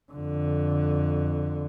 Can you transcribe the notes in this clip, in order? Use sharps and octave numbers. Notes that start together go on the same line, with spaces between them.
F2 D3